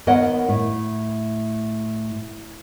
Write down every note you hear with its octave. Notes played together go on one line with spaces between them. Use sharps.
D#2 B3 A#4 C#5 D#5 F#5
A2